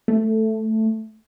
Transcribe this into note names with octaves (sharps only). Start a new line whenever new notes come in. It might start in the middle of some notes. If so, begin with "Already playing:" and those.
A3